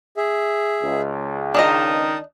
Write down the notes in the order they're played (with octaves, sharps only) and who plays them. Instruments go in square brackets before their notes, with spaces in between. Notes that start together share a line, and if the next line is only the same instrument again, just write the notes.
[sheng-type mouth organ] G#4 E5
[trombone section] C#2
[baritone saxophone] D#3 [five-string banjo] D4 D#4 D#5 [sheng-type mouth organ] A5 D#6